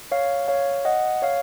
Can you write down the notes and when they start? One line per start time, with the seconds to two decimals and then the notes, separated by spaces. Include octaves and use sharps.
0.11 C#5 F5
0.48 C#5 F5
0.85 D#5 F#5
1.22 C#5 F5